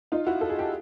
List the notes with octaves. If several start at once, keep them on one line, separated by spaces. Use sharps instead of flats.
D#4 F4
E4 F#4
A4
G#4
G4